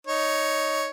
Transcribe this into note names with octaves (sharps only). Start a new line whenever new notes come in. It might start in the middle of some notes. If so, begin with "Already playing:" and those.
D#4 C#5